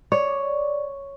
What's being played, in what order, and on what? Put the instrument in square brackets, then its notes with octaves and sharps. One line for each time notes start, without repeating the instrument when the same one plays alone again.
[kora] C#5 [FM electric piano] D5